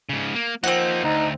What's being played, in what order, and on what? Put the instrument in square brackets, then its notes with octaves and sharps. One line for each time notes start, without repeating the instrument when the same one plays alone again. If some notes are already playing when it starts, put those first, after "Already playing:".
[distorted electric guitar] G#2 C#3
A#3
[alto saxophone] F3 [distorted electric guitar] A#3 D#4 [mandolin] C4 F#5
[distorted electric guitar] D2 [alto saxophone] D#4